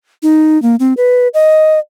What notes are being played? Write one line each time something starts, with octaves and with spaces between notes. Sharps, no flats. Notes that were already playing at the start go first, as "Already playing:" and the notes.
D#4
A#3
C4
B4
D#5